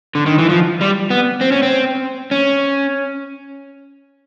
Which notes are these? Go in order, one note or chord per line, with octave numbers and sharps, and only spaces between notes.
D3
D#3
E3
F3
G3
B3
C4
C#4
C4
C#4